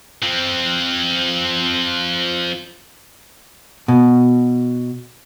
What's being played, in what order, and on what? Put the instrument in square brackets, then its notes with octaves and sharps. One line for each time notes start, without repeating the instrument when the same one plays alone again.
[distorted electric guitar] F3 C4
[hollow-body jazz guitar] B2